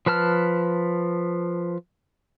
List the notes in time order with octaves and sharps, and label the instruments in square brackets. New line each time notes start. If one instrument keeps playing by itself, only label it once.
[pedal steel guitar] F3 B4 A5 F6